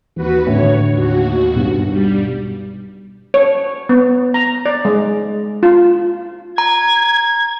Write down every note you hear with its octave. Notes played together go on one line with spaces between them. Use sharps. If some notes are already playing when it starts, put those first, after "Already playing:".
D#2 E3 F#4 B4
A2 D3 C#5
D#2 F#4
B1 G2
G3
C#5
B3
A#5
D5
G#3
F4
A#5 G#6